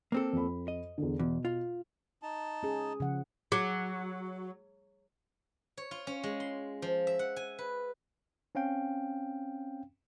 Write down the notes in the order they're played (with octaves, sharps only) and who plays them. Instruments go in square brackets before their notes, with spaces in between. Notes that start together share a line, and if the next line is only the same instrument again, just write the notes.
[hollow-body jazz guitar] A#3 C4 A4
[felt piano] F2 B5
[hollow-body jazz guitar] D#5
[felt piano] E2 D3
[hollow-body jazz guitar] E2 [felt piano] B2
[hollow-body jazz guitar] F4
[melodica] D#4 A5
[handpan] C#4 G#4
C#3 F3 F#5
[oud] F#3 [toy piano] G#4
[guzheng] C#5
F4
C#4
G#3
C6
F3
E5
F#5
G#5
B4
[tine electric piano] C4 C#4 F5 G5